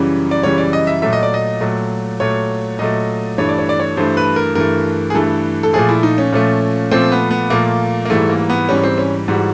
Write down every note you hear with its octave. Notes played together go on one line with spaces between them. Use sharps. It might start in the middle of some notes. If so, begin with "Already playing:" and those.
Already playing: F#2 C#3 E3 G3
D5
F#2 C#3 E3 G3 C#5
D5
D#5
E5
A#2 F#3 A3 E5
D#5
D5
D#5
A#2 F#3 A3
A#2 F#3 A3 C#5
A#2 F#3 A3 D#5
G2 E3 A3 C#5
D5
C#5
D5
C#5
G2 E3 A3 C5
B4
A#4
G2 E3 A3 A#4
G#4
G2 E3 A3 A4
A4
A#2 F3 A3 G#4
E4
D#4
C#4
A#2 F3 A3
A#2 F3 A3 C4
B3
B3
A#2 F3 A3 A#3
A#3
G#2 E3 G3 A3
A#3
B3
G#2 E3 G3 C#4
C4
C#4
G#2 E3 G3 F#4